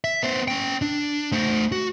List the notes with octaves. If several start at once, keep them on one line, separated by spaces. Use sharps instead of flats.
E5
B3 C5
C#4 G5
D4
A3 C5
F#4